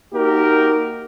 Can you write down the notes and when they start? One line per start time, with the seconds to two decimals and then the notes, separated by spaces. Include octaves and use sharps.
0.14 A#3 D#4 F#4 G4 A#4